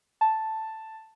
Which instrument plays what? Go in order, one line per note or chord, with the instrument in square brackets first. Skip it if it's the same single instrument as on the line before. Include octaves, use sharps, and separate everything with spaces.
[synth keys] A5